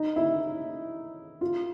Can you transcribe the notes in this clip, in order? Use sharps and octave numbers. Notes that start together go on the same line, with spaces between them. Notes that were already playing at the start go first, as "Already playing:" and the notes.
Already playing: D#4
E4
F4